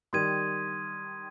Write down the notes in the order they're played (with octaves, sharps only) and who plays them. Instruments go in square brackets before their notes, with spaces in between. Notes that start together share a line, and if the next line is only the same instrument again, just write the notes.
[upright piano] D#3 G3 [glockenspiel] C6 D#6 G#6 D#7